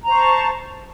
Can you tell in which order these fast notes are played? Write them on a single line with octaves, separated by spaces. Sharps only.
A#5 C5 C#6 A5